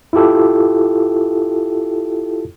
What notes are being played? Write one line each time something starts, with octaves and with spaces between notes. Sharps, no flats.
E4 F4 G4 A4